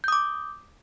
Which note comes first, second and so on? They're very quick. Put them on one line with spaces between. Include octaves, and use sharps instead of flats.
G6 D#6 D6